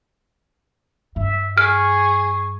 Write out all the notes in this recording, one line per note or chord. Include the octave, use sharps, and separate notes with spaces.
G2 E5
G#4 C#6 F6